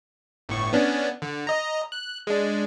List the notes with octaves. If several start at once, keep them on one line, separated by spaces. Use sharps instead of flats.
G1 A2 C#6
B3 C#4 D4
D3
D#5 A#5
F#6
G#3 D4